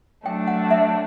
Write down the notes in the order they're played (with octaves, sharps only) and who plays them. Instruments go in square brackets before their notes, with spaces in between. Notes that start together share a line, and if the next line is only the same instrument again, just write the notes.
[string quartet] F#3 A3 D4 [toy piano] G5
[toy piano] F#5
E5